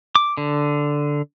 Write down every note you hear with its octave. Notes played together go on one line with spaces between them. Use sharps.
D6
D3